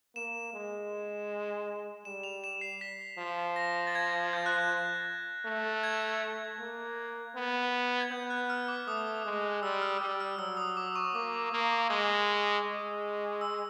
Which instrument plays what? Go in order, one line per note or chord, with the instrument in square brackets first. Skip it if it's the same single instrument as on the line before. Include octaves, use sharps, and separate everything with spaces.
[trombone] A#3 [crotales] E7
[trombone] G#3
[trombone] G3 [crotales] E7
[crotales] F7
E7
C7
B6
[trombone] F3
[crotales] A#6
A6
G#6
G6
F#6
G6
[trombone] A3
[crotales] G#6
[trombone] A#3
B3
[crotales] G#6
[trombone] B3 [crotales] G6
[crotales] F#6
F6
D6
[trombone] A3 [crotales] D#6
[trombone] G#3
[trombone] G3 [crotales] E6
[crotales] F6
[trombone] G3
[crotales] F6
[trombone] F#3 [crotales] E6
[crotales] D#6
D6
C#6
[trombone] A#3 [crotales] D6
[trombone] A#3
[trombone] G#3 [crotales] D#6
[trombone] G#3
[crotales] E6